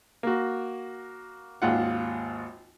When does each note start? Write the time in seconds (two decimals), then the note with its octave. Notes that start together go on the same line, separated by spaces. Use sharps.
0.23 A#3 F#4
1.62 G#1 D#2 F4 F#5